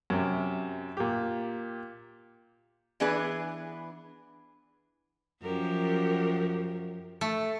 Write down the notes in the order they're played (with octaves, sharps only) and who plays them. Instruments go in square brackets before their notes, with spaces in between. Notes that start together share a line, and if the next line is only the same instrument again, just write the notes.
[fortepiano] F#2 C3
A#2 G4
[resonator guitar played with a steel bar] E3 B3 D4 G#4 B4
[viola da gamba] F#2 F3 [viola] G4 A#4
[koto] A3